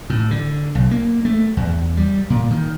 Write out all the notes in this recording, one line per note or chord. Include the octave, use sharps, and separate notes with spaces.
A2
D3
B1
A#3
A3
E2
G3
A#2
D#3